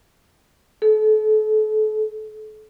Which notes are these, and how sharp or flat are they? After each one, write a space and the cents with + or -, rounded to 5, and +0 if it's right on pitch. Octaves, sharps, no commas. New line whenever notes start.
A4 -35